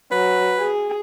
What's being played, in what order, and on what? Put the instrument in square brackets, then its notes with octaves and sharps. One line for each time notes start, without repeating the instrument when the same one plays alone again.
[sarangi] F#3 [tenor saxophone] B4
[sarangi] G#4